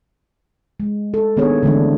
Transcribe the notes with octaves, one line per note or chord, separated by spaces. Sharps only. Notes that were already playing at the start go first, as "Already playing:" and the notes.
G#3
A4
D#3 A#3 B3 D4 G#4 C#5
D3 E3 G#3 A3 C4 D4